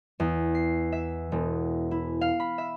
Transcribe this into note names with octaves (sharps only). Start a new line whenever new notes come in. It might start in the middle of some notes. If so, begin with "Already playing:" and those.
E2
C7
E5
E1
E4
F5
B5
E5